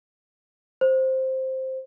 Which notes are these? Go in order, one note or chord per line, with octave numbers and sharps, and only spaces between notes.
C5